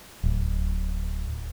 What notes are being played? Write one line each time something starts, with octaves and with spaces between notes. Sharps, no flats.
D1